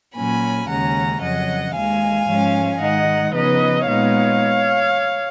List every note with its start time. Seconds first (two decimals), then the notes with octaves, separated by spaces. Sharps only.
0.16 A#2 F#3 A#3 C#4 G#5 B5
0.69 D#2 C#3 G#3 C#4 F#5 A#5
1.22 F2 C#3 F#3 D#5 F#5
1.75 D#2 D#3 G#3 F5 G#5
2.28 G#2 F3 G#3 C#4
2.81 G#2 D#3 G#3 D#4 D#5 F#5
3.34 C#3 F3 B3 D#4 B4 D#5
3.87 A#2 G#3 B3 D#4 C#5 F5